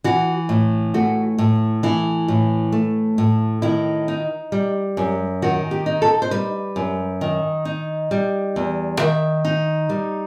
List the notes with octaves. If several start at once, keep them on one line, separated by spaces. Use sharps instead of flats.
E3 F#4
A2
A3 F#4
A2
E3 E4
A2
A3
A2
D#3 E4
D#4
G3
F#2
D#3 F#4
G4
D#4
A4
C5
G3 B4
F#2
D#3
D#4
G3
E2
D#3 E5
D#4
G3